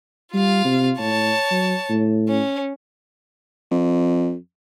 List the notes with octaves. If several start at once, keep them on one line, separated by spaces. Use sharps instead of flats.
G3 F4 F5
C3
A2 C#5 A5
F#3
A2
C#4
F2